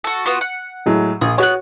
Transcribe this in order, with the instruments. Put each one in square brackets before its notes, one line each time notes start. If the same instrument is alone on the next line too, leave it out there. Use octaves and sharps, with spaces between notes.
[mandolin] F#4 A4
B3 F4 F#4
F#5
[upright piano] A2 F#3 G#3
[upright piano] A#1 [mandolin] G#4
[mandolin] B3 A5 F#6 [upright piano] F#4 C#5